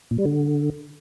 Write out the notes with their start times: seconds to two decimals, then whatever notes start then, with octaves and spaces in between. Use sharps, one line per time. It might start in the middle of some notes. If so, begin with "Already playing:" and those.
0.11 A#2
0.18 G3
0.25 D3